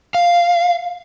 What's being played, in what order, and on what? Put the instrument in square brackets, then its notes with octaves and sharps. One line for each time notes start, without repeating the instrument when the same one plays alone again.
[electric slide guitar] F5